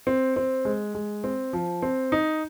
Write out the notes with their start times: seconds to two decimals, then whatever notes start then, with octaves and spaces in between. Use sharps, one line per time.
0.07 C4
0.36 C4
0.65 G#3
0.95 G#3
1.24 C4
1.53 F3
1.82 C4
2.12 D#4